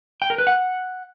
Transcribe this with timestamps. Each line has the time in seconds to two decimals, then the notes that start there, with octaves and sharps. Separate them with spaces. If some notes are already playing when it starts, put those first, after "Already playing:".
0.22 G5
0.30 A#4
0.38 B4
0.47 F#5